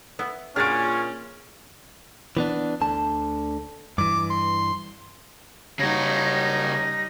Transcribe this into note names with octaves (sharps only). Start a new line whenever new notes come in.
B3 E4
A#2 C#4 D4 F#4 G#4 F6 A6 D7
E3 B3 D4
D2 D3 A5
G2 E3 D6
C6
C#3 G3 D#4 F#4 C#5 A#6